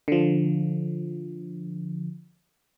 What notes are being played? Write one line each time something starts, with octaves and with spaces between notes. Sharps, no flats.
D3 F3